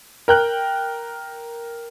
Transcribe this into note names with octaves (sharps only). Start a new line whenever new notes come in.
A#4 G5 F#6